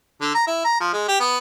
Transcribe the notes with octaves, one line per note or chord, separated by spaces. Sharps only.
D3
A#5
E4
A#5
F3
G#3
G4
B3